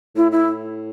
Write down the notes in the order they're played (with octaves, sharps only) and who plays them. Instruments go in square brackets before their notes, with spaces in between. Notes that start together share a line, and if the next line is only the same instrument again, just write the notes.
[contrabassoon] A2 [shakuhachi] E4
[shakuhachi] E4